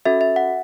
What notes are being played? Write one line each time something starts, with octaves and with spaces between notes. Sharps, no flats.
C#4 F#4 A4 E5
E5
F#5